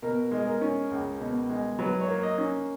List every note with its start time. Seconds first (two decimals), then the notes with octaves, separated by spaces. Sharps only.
0.02 B2 A#4
0.31 G#3
0.38 G#4
0.47 A#4
0.61 C#4
0.91 C#2
1.20 B2
1.50 G#3
1.79 F#3 B4
2.01 C#5
2.08 A#3
2.23 D#5
2.38 C#4